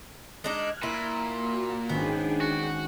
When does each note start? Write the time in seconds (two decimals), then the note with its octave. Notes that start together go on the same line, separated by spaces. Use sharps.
0.44 G#3 D4 D#4 F6 F#6 G#6
0.83 A#2 E4
1.36 A#3 F#4
1.89 G#1 B3 C#4 D4 G#4 G5
2.41 F#4